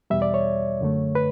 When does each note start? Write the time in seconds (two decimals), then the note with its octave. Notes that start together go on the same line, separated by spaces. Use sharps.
0.10 E2 B2 G3 E5
0.22 D5
0.34 C#5
0.81 F#2 D3 A3
1.15 B4